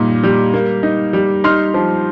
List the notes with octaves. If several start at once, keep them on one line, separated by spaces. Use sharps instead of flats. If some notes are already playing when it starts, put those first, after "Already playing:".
Already playing: A#2 G3 D#4
G3
A#3
D#4
G3
D#4 C6 F6
F3